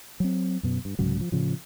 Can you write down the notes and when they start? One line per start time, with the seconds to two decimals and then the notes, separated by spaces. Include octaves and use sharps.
0.20 F#3 C4
0.63 F#2 B2
0.85 G2
0.99 C2 G#2 C#3 F#3
1.21 F3
1.32 A2 C#3 F3